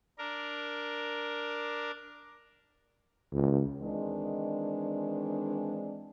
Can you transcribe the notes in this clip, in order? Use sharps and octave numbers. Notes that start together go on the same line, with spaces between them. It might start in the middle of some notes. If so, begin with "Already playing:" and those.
D4 A#4
C#2
D#3 E3 G#3 C4 D4